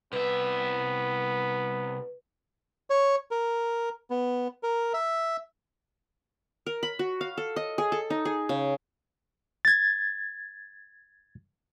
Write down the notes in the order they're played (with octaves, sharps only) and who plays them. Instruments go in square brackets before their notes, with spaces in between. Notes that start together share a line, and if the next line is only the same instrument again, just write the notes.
[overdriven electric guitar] C2 E5 [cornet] B3 [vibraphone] B4
[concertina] C#5
A#4
B3
A#4
E5
[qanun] A#4
B5
F#4
F5
A4
D#5
G#4
A4
D#4
G#4
C#3
[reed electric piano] G#6 A6